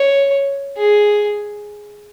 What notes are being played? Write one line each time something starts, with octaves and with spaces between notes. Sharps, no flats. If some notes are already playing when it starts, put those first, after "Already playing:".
Already playing: C#5
G#4